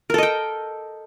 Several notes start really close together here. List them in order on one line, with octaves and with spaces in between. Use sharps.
A#4 A4 D#5 G5